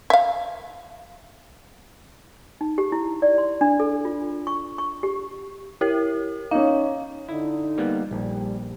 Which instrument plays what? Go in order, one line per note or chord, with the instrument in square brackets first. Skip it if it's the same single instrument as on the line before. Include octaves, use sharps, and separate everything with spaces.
[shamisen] E5 F5
[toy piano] D#4
G4
E4
D5
C6
D4
A4
F4
C#6
C#6
G4
[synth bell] E4 G4 A#4
[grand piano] C#4 D#4 [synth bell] F5
[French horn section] D3 D#4 [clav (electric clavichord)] E4
[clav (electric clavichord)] G3 A#3 B3
[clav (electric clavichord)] A#1 [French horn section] G3